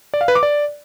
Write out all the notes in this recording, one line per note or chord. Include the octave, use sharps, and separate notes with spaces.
D5
F5
B4
D6
D5